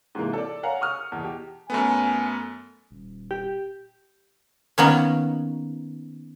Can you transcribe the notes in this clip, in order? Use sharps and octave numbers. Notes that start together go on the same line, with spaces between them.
G#2 C3 E3 A#3
A4 D5
A#4 C#5 F5 F#5 G#5 A#5
C#6 D#6 F6
E2 B2
G4
F#2 A3 B3 G#5
D#1
G4
D#3 A#3 B3 C#4